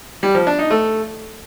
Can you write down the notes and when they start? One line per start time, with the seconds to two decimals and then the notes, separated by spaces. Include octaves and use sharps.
0.23 G3
0.35 F3
0.47 D4
0.59 D#4
0.71 A3